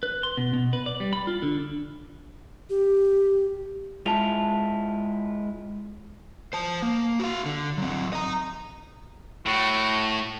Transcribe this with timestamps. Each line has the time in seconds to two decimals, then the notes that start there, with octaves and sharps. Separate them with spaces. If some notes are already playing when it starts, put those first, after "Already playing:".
0.03 B4
0.23 C6
0.37 B2
0.53 B2
0.73 B4
0.86 D5
1.00 G3
1.13 B5
1.27 F4
1.42 D3
2.70 G4
4.06 G#3 E4 F4 A5 F7
6.53 C5 A5
6.82 A#3
7.20 F#4 F5
7.46 D3
7.78 F#3 C4
8.13 D#5 A#5
9.46 A2 F#4